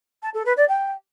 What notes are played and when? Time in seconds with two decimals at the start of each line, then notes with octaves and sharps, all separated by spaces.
0.22 A5
0.34 A4
0.45 B4
0.57 D5
0.68 G5